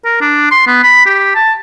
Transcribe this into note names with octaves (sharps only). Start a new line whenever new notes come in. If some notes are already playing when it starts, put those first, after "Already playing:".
A#4
D4
C6
B3
B5
G4
A5